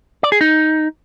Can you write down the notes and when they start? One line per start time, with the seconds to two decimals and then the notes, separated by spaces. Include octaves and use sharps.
0.23 D5
0.32 G#4
0.41 D#4